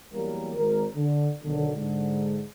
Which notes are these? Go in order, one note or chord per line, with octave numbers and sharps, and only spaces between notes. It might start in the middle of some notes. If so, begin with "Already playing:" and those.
E2 F#3 G3 A#3 G4 A#4
G#1 A#4
D3
B1 D3 D#3
G#2 D3